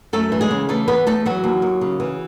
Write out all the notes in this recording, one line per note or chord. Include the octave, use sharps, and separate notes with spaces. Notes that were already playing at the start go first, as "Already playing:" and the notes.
F#2 A3 A4
E3
G#3 G#4
C#3
E3 A3 A4
E2 B3 B4
E2 A3 A4
E3 F#3 F#4
D#2
D#2
C#3
E3